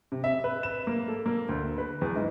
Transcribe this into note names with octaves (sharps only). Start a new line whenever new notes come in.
C3
E5
B4
E7
A#3
A4
A#3
D2
B4
E2
G#2